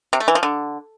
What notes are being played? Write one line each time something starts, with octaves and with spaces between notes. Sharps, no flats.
C3
A3
E3
F3
D3